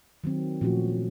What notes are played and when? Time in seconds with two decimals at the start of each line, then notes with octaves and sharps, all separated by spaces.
0.24 D#3 F#3 C4
0.61 A#2 F3 A3 C#4 F#4